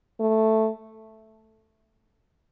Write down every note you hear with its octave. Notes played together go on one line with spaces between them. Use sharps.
A3